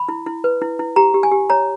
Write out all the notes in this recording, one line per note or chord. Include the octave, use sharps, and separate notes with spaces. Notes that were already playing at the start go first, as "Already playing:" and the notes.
Already playing: B5
E4
E4
B4
E4
E4
G4 A#5
G4
G#5
G4
C#5 A#5